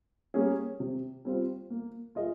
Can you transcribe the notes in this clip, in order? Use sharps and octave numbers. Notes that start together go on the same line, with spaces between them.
G3 A#3 C#4 G#4
C3
G3 C4 F4
A#3
F4 G#4 D#5